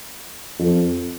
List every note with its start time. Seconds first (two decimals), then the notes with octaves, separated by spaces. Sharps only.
0.59 F2